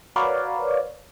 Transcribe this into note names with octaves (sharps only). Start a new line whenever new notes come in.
F#4 A#4 B4 C#5 D5 F5